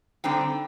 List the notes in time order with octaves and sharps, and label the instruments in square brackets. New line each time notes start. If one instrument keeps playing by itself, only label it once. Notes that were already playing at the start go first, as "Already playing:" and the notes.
[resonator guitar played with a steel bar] D3 G3 C4 D#4 G5